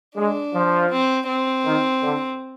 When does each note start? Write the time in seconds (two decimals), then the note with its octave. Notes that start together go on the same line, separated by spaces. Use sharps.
0.17 G#3 D4
0.54 F3
0.90 C4
1.28 C4
1.64 D#3
2.03 D3